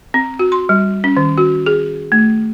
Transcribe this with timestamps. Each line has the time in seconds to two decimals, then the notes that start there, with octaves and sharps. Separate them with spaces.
0.14 C4
0.39 F#4
0.52 C6
0.69 G3
1.04 C#4
1.17 D#3
1.38 F#4
1.66 G#4
2.12 A3